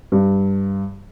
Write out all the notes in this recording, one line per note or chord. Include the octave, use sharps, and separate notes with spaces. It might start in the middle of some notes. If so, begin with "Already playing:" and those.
G2